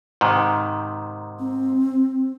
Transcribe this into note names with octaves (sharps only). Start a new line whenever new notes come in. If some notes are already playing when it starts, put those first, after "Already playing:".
G#2 C3 D#3
C4